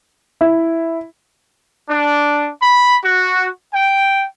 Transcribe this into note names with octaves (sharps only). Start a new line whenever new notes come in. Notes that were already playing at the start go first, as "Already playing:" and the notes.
E4
D4
B5
F#4
G5